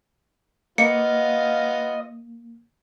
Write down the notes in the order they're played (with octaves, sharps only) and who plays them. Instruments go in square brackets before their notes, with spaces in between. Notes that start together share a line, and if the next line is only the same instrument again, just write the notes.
[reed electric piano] A#3 [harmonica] B3 F4 F5 [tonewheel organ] D#5 [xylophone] C#7